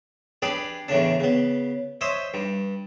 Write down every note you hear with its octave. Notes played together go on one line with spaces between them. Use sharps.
D4 G4 G#4 B4 D5
E2 A2 C#3 D4
C#3 B3
C5 C#5 D#5 E5
G2